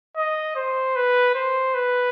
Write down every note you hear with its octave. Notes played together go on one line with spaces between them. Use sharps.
D#5
C5
B4
C5
B4